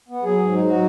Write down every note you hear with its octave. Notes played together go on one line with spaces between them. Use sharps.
B3
F#3 G#4
G#2
D#4
F#3 F#4